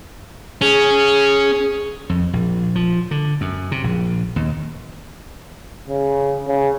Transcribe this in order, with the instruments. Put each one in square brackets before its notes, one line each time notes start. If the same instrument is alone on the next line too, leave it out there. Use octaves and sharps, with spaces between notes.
[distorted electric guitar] C#4 [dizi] G#4
[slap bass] F2
A#1
F3
D3
F#2
C3
A#1
D#2
[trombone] C#3
C#3